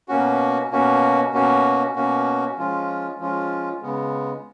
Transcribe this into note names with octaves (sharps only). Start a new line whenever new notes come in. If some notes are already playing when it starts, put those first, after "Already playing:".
B2 A#3 C#4 F#4
B2 A#3 C#4 F#4
B2 A#3 C#4 F#4
B2 A#3 C#4 F#4
F3 G#3 C#4 F4
F3 G#3 C#4 F4
C#3 G#3 B3